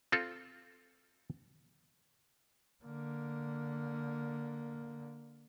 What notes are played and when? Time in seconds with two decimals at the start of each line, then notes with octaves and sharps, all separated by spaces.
0.12 C4 F4 A4
2.84 D3 A#3